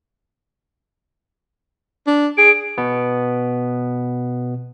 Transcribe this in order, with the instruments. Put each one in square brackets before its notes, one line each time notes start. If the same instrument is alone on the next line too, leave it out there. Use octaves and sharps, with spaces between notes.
[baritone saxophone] D4
[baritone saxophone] G#4 [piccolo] D7
[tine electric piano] B2 B3